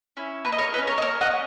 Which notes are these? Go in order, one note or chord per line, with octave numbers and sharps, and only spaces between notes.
C#4 E4
A#3 B4
D#5
A#4 C#5
E4 B4 D#5
C#4
A#4 C#5
D#5
A#3 A#4 C#5
D#5 F#5
C#4